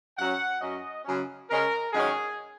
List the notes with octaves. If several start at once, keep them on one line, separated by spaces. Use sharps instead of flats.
F#2 F#3 C#4 F#5
F#2 F#3 C#4 D#5
F#2 C#3 F#3 C#4
C#3 G#3 C#4 A#4
F#2 D#3 G#3 C#4 G#4